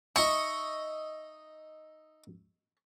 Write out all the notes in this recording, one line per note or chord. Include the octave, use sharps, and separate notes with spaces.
D#4 D#5 E5 C#6